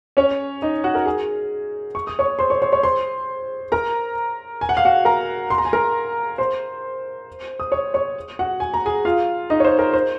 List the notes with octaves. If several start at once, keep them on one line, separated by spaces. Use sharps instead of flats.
C#4 C#5
D#4 D#5
F#4 F#5
A#4
G#4 G#5
C#6
D#6
C#5 C#6
C5 C6
C#5 C#6
C#5 C#6
C#5 C#6
C5 C6
A#4 A#5
G#5
F#5
F5
F#4 F#5
A#4 A#5
C6
A#5
G#5
A#4 A#5
C5 C6
D#6
C#5 C#6
C#5 C#6
F#4 F#5
G#5
A#5
G#4 G#5
F4 F5
D#4 D#5
C#5
C5
A#4
C5